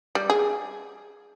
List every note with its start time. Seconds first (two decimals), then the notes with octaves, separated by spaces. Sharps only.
0.15 G3
0.30 G#4